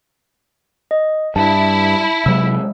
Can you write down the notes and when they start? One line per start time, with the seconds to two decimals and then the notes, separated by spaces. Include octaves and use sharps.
0.91 D#5
1.36 G2 E4 A5
2.26 C3 F#3 G#3 E6